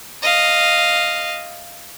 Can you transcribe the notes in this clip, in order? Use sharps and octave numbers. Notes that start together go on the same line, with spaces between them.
D#5 F5